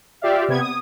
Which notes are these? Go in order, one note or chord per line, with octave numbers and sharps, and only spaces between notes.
F4 G4 D5 E5 F5
C3 B3 G#6
D#6